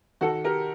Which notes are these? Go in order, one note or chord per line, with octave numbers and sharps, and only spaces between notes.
D#3 F#4 A4
G4 A#4